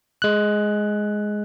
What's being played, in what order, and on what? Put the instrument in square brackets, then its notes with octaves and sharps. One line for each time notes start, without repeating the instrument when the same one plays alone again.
[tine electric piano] G#3 F#6